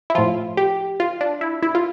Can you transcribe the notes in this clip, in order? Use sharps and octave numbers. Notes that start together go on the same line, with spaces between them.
E4
A2 F3 F4
G4
F4
D4
E4
E4
F4